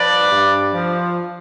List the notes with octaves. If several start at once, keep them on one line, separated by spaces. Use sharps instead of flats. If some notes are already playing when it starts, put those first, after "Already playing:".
Already playing: F3 B4 D5
G2
F3